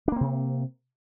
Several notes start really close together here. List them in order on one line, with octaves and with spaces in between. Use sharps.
D4 A#3 C4 C3